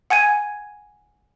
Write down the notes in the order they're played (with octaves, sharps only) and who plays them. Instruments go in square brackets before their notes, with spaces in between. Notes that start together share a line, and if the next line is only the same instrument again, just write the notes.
[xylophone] F#5 G#5 G#6 D#7